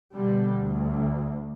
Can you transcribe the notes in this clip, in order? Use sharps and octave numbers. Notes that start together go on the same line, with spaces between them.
B2 D3 G3
D2